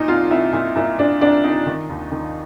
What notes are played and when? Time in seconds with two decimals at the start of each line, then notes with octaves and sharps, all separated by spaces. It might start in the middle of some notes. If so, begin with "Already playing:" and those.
Already playing: A#2 D#4
0.08 C2 F4
0.30 C2 E4
0.53 A#2 E4
0.76 A#2 E4
0.99 A#2 D4
1.21 C2 D4
1.44 C2 D#4
1.66 D#3
1.89 D#2
2.11 D#3